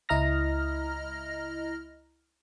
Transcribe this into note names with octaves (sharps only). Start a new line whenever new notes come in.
C#2 E4 D#5 A#5 F6 A#6